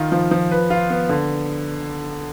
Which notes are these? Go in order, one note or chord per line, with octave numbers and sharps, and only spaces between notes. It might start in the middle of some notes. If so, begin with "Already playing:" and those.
Already playing: D#3 F4
F3
F3
B4
F4
B3
D3